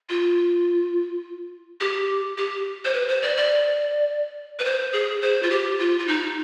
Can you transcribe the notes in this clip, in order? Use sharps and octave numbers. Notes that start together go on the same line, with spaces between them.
F4
G4
G4
C5
B4
C5
D5
D5
B4
C5
G#4
C5
F4
G4
F4
F4
D#4